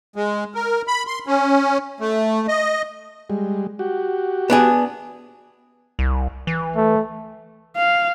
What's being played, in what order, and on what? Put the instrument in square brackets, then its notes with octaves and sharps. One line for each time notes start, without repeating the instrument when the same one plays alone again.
[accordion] G#3
A#4
B5
C6
C#4
A3
D#5
[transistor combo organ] G3 G#3
F#4 G4
[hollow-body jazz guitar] B3 D4 G#4
[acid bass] C2
E3
[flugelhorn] A3
[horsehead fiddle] F5